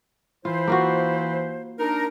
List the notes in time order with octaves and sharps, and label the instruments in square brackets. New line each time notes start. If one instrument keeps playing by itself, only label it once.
[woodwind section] E3 E4 C5 [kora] F4
[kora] A#3 F4 F#4
[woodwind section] D4 D#4 A#4